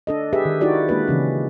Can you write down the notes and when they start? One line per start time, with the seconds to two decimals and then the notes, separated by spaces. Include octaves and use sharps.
0.07 D4 A4 D#5
0.33 G4 G#4 B4 E5
0.45 D#3
0.61 D#4 E4 F#4 G4 D5
0.89 G#3 A#3 D4 B4
1.08 C#3 E3 C#4